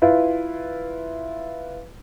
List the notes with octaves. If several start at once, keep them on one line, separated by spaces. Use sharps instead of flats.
E4 F4 B4